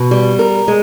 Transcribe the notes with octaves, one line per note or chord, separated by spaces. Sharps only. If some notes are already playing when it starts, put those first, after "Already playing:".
Already playing: B2
G3
A#4
G#3